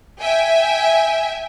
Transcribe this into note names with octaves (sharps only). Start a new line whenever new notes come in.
E5 G5 G#5